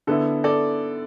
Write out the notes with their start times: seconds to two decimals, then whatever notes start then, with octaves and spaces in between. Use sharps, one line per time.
0.07 D3 B3 E4 A4
0.44 A4 D5